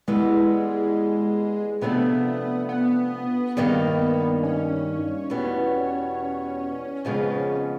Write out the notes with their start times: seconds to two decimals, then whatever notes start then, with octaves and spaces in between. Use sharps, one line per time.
0.08 E3 G3 G#3 B3
1.82 C3 F3 A3 B3 D4
2.69 B3
3.57 G2 D#3 G3 A#3 D#4
4.43 C#4
5.30 E2 B2 G3 B3
7.05 F2 C#3 F3 G#3 B3